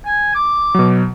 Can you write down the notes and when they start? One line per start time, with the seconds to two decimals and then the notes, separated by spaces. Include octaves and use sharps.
0.06 G#5
0.35 D6
0.75 B2 F#3